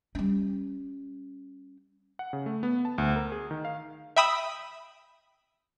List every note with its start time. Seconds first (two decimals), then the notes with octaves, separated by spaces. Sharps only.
0.15 G3 C#4
2.19 F#5
2.33 C#3
2.46 A3
2.63 B3
2.85 A5
2.98 D2
3.16 A#4
3.32 G#4
3.51 D#3
3.65 F5
4.16 E5 G5 B5 D#6 E6